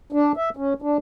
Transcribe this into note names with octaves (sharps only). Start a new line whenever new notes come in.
D4
E5
C#4
D4